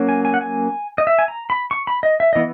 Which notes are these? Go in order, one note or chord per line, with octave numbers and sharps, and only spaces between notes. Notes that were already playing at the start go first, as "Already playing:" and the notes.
Already playing: F#3 A#3 C#4
G#5
G#5
F#5
G#5
D#5
E5
G#5
A#5
B5
C#6
B5
D#5
E5
E3 B3 D#5